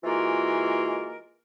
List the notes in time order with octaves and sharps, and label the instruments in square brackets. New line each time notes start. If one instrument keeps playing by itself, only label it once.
[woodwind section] E3 G#3 A#3 F4 F#4 A#4